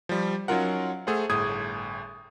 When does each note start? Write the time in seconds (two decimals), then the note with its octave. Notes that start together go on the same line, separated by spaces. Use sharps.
0.09 F3 G3
0.48 F#3 C#4 D#4 F4 A#4 F#5
1.07 A3 G#4 A4 C5 F#5
1.29 G1 A2 G#4 D#6 G#6